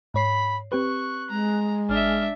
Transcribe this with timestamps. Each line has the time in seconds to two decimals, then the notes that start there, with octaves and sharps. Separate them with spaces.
0.14 G#2 C#5 B5 C7
0.72 C4 G4 B4 C#6 F#6
1.30 G#3 A#5
1.89 G#1 D4 E5 F6